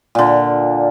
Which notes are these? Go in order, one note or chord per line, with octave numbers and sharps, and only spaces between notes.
A#2 D3